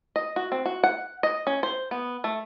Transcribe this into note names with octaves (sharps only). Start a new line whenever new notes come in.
D#5
F#4
C4
F#4
F#5
D#5
C#4
C5
B3
A3